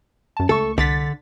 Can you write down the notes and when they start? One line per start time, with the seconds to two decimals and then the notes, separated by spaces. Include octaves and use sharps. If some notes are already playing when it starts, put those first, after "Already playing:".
0.37 F#2 A5
0.49 C#2 A3 A4 C#6
0.78 C2 D3 A6 B6